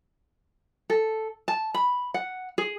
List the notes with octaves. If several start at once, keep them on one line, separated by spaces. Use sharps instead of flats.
A4
A5
B5
F#5
G#4